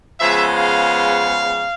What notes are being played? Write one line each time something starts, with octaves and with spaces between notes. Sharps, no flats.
C#3 F3 G#3 B3 E5
F5